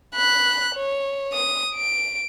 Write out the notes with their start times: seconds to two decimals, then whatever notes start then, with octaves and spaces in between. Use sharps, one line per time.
0.15 B5 F#6
0.75 C#5
1.34 D#6
1.76 D7